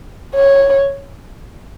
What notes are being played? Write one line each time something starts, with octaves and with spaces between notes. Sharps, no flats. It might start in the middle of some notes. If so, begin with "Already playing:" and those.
C#5